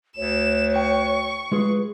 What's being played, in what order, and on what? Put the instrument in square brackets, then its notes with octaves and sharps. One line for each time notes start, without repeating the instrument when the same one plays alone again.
[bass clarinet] D2 [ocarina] C#5 [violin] E7
[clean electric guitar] G5 [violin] C#6
[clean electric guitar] G#3 F4 G#4 [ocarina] B4